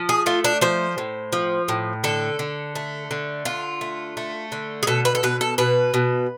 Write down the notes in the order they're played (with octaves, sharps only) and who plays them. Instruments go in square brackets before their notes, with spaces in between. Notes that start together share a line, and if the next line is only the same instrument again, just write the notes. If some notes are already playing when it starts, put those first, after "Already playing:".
Already playing: [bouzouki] F3
G#4
A3 F4
D4
F3 C5
A2
F3
A2
D3 A4
D3
A3
D3
D3 F4
A3
A3
D3
G#4
B2 A4
B4
A4
B2 B4
A4
B2 B4
B2